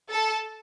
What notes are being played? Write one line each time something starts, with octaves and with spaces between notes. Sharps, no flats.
A4 A5